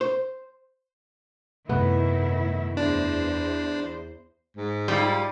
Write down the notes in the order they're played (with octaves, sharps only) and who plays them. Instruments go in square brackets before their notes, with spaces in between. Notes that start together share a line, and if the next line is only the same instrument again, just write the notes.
[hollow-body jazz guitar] C5
[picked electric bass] F#2 C3 A3 [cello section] A2 D#3 E4 [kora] B3
[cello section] E2 C5 [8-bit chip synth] D4
[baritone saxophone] G#2
[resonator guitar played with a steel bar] G3 [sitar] D#4 F4 G4